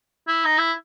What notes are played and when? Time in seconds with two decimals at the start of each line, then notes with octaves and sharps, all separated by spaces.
0.28 E4
0.45 D#4
0.58 E4